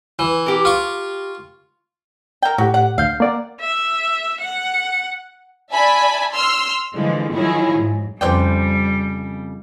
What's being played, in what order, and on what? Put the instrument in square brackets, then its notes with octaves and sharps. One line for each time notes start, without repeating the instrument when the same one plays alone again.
[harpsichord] E3
[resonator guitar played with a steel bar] G4 A#4
[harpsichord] F4 C#6
[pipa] A#4 G5
[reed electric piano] A2 G4 [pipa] F#4
[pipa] F#5
[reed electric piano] D2 G6 [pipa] F5
[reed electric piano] A#3 D5 F#5
[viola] E5
F#5
[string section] D5 E5 G#5 A5 B5
C6 E6 F6
D3 E3 F3 G#3
D#3 F3 F#3 E4 G#4 C#5
G#2
[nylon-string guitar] F2 C#3 [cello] G3 [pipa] C5 D5 G5